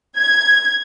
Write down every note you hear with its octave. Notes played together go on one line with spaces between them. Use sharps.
G#6